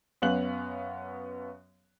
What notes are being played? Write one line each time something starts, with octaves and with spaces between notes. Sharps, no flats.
F#2 B3 C#4 F5 F#6 F#7